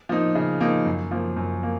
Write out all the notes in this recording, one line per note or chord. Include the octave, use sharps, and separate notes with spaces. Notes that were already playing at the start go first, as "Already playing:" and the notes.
F3 A#3 D#4
C#3
F3 A#3 D#4
F#2
F3 A#3
F#2
A#3